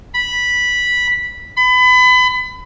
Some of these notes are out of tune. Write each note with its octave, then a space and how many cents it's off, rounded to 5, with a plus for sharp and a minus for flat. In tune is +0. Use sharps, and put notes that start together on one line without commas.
B5 -10
B5 +30